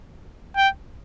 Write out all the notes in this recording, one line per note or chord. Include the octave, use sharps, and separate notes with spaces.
G5